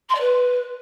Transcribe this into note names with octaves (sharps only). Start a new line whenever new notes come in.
C6
D5
B4